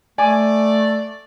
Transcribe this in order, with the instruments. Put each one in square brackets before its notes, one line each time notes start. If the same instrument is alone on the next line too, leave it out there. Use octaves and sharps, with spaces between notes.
[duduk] A3 [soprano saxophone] D5 [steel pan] G#5 D6